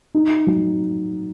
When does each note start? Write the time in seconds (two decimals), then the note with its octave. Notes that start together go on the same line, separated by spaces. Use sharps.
0.14 D#4
0.47 F#3